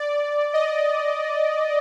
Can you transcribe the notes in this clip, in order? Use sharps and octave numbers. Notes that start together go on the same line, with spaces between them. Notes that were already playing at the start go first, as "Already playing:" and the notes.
Already playing: D5
D#5